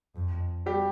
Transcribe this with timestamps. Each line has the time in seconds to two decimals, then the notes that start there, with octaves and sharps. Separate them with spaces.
0.16 F2
0.66 G3 G4